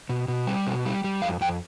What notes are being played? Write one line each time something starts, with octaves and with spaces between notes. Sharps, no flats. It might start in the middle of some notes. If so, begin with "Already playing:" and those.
B2
B2
G3
B2
G3
G3
F2 F5
F2 G5